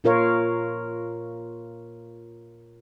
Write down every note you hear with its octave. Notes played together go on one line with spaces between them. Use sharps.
A#2 F4 A#4 C#5 F5